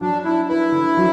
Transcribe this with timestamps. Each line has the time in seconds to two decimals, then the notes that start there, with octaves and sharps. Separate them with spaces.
0.01 F#3 D4
0.25 D4 E4
0.48 E4 B4
0.72 D3
0.97 F#3